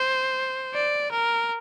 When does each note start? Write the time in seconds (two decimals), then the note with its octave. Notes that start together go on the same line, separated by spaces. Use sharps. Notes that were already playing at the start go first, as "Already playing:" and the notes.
Already playing: C5
0.74 D5
1.12 A#4